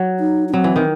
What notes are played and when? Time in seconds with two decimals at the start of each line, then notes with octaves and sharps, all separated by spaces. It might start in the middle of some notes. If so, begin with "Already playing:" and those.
Already playing: F#3
0.20 D#4
0.49 D#4
0.53 F#3 C4
0.64 E3
0.76 D#3